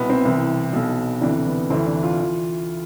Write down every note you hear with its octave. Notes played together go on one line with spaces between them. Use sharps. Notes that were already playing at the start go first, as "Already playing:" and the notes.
Already playing: C2 B2 B3
C4
C2 C3 E3
B1 B2
D2 C3 E3 D4
B3
D2 C3 E3 C4
D4
F4
E3